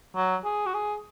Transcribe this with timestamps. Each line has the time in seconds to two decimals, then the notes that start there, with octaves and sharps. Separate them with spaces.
0.16 F#3
0.44 G#4
0.66 F#4
0.74 G#4